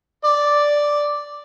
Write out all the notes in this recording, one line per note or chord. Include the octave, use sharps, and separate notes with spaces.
D5